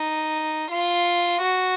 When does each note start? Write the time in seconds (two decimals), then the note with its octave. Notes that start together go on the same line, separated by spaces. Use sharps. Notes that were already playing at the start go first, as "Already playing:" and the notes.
Already playing: D#4
0.71 F4
1.42 F#4